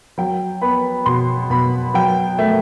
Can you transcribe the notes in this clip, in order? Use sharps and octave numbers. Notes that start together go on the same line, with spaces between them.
F#3 G5
B3 B5
B2 C6
B2 B5
F#3 G5
A3